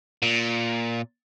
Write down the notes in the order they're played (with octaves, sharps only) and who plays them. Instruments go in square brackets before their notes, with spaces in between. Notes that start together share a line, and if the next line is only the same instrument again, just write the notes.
[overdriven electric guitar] A#2